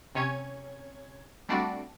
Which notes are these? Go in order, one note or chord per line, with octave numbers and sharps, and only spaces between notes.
C3 C#4 C#5 G#6
G3 A3 C4 D4 F#4 D5